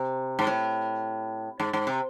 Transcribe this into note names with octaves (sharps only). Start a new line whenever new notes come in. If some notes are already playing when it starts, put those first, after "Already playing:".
Already playing: C3
G#2
A2
G#2
G#2
C3